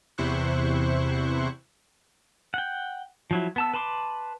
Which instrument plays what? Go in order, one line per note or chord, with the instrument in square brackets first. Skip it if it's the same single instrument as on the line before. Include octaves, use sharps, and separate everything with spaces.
[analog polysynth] E2 C3 E4 C5 C#6 F#6
[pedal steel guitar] F#5 G5
F3 F#3 E4
B3 A5 E6
B4 A5 B5 C6 D6